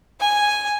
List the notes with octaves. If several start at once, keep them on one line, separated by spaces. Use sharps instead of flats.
G#5